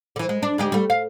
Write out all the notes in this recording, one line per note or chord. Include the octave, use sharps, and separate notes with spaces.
D3 E3
G#3
D4
D2 G#3 G4
G3 A3
F5